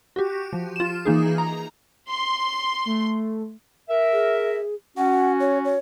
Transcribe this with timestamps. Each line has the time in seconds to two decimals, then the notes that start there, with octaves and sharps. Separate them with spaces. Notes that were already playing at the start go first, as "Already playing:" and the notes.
0.16 F#4 G4
0.53 F3
0.76 F4 E7
1.05 E3 A#3 D#4 G#4
1.38 A#5
2.10 C6
2.85 A3
3.89 A#4 E5
4.13 G#4
4.97 C#4 F#4 F#5
5.40 C#5
5.65 C#5